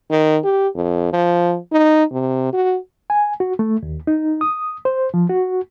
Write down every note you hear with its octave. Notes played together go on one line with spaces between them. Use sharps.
D#3
G4
F2
F3
D#4
C3
F#4
G#5
F#4
A3
D#2
D#4
D#6
C5
F3
F#4